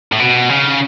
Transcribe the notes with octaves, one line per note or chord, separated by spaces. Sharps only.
A2
B2
C#3